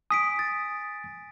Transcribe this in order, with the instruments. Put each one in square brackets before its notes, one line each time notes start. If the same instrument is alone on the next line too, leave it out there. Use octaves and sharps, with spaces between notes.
[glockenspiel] G#5 B6 D7 [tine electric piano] D#6
[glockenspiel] A6